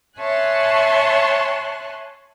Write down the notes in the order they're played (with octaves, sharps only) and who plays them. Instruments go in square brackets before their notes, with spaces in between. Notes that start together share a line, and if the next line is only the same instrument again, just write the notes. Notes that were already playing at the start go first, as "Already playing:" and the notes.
[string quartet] C#5 E5 G#5 A5 C6 F#6